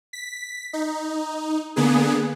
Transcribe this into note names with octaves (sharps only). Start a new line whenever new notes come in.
B6
D#4
D3 A#3 B3 G#4